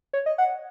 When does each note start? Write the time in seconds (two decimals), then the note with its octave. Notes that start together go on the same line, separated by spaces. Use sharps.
0.13 C#5
0.26 D#5
0.38 F#5